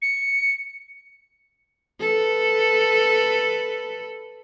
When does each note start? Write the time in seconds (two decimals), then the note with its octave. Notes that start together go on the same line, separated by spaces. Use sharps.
0.02 C#7
2.00 A4 B4